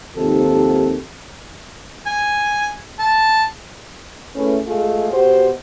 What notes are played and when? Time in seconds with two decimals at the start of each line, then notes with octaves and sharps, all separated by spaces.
0.16 D#2 G#2 C3 D#3 F3 A4
2.06 G#5
2.99 A5
4.35 A3 C#4 E4 G#4 B4
4.67 G#3 A3 F4 G#4
5.11 B2 F#4 G4 C5